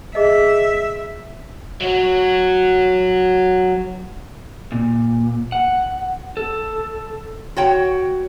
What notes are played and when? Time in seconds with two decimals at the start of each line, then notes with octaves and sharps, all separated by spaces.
0.15 G#4 D#5 E5
1.81 F#3 F#4
4.72 A#2
5.52 F#5
6.37 A4
7.56 F#4 C#5 G5